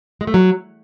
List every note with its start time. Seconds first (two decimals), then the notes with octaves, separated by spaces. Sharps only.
0.21 G#3
0.27 A3
0.34 F#3